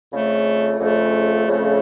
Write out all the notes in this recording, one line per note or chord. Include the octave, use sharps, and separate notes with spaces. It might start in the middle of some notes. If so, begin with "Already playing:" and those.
F2 C#3 A3
F2 C#3 A3
F2 C#3 A3